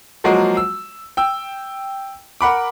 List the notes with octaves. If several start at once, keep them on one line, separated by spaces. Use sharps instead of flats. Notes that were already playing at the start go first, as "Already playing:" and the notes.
F3 F#3 G#3 A#3 F#4 G#4
E6
G5 E6
A#4 F#5 B5 D6